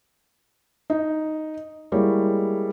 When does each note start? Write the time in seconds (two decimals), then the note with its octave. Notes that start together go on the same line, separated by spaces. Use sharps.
0.90 D#4
1.92 G3 G#3 A#3 E4 C#5